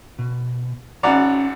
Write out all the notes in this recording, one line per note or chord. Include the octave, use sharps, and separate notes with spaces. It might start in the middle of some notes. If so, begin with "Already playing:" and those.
B2
G#1 C#4 F#4 D5 F#5 A#5